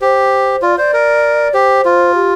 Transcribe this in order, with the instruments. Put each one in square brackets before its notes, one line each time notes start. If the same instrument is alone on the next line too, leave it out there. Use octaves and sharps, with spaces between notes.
[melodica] G4 [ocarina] C5
[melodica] F4 [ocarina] D5
[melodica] C5 [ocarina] D5
[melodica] A#4
[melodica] G4 [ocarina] C5
[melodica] F4
[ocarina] G4